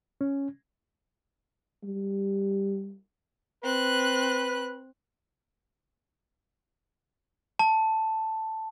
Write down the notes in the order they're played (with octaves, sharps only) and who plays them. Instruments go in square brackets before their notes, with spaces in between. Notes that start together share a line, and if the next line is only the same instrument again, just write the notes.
[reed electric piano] C#4
[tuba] G3
[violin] C4 F#6 [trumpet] B4
[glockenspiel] A5